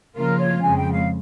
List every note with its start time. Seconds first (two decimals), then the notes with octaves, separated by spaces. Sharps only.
0.16 C#3 F3 A#3 F4 A#4
0.38 C#5
0.61 F2 C#3 G#3 G#5
0.77 G5
0.92 F5